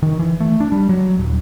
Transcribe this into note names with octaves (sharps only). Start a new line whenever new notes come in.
D#3
E3
A3
D4
G3
F#3
D#1